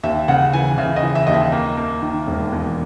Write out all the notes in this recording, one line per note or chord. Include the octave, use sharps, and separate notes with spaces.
D#2 E5
C#3 F#5
E3 G#5
C#3 E5
D#5
E3
E5
D#2 D#5
E5
A#3
A#3
D#3
E1
E2